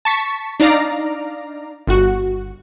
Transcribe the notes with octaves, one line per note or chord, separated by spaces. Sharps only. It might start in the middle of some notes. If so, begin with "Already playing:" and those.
A5 C#6 B6
D4 D#4 D5 F5 A#5
G1 F#4